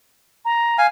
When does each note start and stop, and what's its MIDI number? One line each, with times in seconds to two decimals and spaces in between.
0.45 0.77 82
0.78 0.87 77
0.78 0.87 80